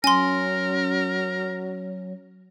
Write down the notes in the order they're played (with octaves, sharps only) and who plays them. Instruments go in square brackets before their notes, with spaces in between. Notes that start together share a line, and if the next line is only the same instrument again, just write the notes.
[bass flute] F#3 [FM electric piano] C#4 [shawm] A#4 [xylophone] G#5 C6